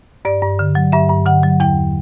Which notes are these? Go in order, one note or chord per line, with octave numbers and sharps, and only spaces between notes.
G2 D5
G2
D3
F#3
G2 E5
G2
D3 F#5
F#3
E2 G5